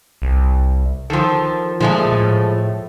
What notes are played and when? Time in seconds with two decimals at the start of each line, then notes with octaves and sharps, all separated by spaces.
0.22 C2
1.10 D#3 F3 A4
1.80 A#2 F3 G#3 A3
2.12 A2